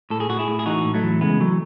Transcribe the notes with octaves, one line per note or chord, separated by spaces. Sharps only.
A2 A4
G#4
A2 F#4
E4 G#4
A2
G#4
E3 D#4 F#4
A2
F#3 A3
E3
C#3 G#3 B3
E3 F#3 A3